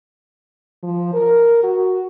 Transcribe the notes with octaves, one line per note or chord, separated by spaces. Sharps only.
F3
A#4
F#4